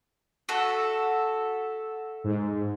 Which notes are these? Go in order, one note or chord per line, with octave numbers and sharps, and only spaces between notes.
F#4 A4 E5
G#2